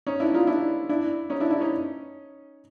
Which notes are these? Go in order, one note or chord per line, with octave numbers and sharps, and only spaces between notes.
C#4 D#4
D4 E4
D#4 F4
D4 E4
D4 E4
C#4 D#4
D4 E4
D4 E4
C#4 D#4